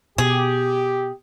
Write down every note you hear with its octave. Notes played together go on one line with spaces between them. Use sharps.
B2 G4 G#4